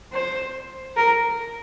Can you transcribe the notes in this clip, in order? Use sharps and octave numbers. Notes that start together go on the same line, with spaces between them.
C5
A#4